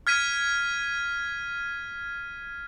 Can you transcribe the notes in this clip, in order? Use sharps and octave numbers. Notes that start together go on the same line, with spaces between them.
F6 G#6 B6 D#7